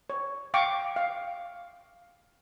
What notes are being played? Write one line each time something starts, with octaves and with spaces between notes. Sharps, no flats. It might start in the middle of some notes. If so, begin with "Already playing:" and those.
C#5
F5 G5 C#6 D6
F5